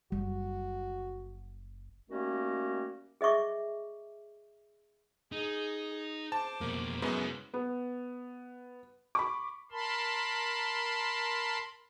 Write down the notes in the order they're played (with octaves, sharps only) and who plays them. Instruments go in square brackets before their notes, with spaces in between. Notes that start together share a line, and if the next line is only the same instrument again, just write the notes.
[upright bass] F#1 [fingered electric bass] G3 [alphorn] F#4
[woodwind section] D#3 G3 A3 A#3 C#4 F#4
[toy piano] G#4 D#5 E5 C#6 D6
[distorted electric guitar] D#4 [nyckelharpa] G#4
[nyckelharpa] C5 D6 [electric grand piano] A5
[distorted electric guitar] F2 B2 [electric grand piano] A#3
[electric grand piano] F#2 G#3 B3 [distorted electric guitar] E4 C5
[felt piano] B3
B5 C#6 D6
[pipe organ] A#4 A5 B5 C6